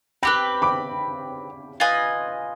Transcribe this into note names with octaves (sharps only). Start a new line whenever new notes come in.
C4 G4 B4 G5 B5
B5 D6
F4 B4 D#5 G#5